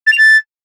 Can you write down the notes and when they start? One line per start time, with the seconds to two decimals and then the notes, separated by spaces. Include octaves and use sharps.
0.07 A6
0.12 F7
0.18 A6